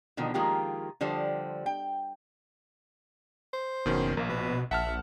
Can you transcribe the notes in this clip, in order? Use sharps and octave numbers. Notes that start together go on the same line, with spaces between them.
B2 D3 D#3 F3
D#3 F3 G#3 A#3 F4 G4
D3 F3 G3 C5 D5
G5
C5
F#1 B2 D#3 C#4
A#1 A#3
B2 B4
A#1 E5 F#5 A5 F6